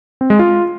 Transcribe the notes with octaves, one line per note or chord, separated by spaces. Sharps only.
C4
G#3
F4